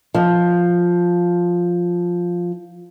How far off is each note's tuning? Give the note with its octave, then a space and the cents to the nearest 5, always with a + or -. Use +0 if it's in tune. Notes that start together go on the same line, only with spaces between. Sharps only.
F3 +5